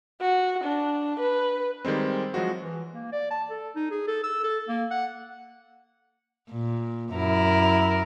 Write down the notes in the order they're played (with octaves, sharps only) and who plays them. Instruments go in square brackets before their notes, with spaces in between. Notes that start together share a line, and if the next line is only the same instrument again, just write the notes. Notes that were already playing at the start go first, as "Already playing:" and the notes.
[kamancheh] F#4
D4
B4
[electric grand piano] D#3 G3 G#3 C4
F3 F#3 G#3 F#4
[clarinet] E3
A#3
D5
A5
A4
D#4
G#4
A4
E6
A4
A#3
F#5
[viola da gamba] A#2
F#2 E4 A#4